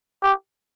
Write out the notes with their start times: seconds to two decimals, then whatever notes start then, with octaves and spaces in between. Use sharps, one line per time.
0.23 G4